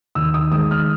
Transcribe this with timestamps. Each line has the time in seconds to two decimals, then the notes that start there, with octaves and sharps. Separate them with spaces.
0.15 D#2 E6
0.34 D#6
0.52 D#3 G#3 D#6
0.71 F6